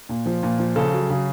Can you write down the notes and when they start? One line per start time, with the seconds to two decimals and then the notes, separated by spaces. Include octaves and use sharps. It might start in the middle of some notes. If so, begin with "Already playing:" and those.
0.09 A#2
0.26 F3
0.43 A#2
0.59 F3
0.76 C#3 A4
0.93 F#3
1.10 C#3